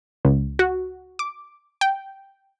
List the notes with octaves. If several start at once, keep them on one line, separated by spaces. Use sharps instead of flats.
C#2
F#4
D6
G5